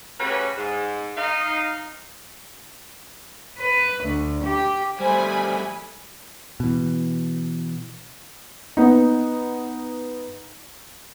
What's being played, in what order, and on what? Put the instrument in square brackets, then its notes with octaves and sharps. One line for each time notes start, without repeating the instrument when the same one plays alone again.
[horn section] C#3 A3 C#4 F#4 G4 B4
G#2
D#4 F5
[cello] B4
D2
G4
[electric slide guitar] G3 A3 [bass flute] C5 [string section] G#5 B5
[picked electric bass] B2 E3
[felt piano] B3 D#4